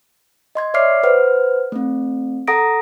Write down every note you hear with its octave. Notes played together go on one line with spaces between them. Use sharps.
D#5 C6 G#6
C#5 D5 E5 D6 F6 C7
B4 C5 F#5 F6
A3 C4
A4 F#5 A#5 D#6 A#6 D7